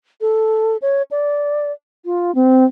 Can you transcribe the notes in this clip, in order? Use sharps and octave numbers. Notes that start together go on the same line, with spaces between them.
A4
C#5
D5
F4
C4